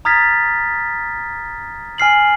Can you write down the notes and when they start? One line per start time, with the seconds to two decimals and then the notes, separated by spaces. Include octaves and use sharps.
0.05 A#5 D#6 F6 G#6 A6 B6
1.98 G#5 F6 C7 F#7